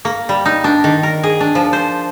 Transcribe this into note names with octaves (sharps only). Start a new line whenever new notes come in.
A#3
G3
D#4
D4
D#3
A#4
G#4
D4
F3
C5